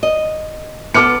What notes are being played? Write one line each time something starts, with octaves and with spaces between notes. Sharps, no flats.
D#5
B3 A4 D6 F6 C#7